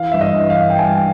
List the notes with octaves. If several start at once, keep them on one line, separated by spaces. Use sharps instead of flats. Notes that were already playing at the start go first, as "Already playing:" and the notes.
Already playing: E3 F5
G2 E5
D#5
E3
F5
G2
G5
G2 G#5